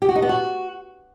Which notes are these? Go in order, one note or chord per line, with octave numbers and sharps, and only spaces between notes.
G4
F#4
D#4
B3
F#4